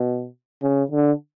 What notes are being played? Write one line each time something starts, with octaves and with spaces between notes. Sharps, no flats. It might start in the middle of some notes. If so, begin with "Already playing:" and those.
Already playing: B2
C#3
D3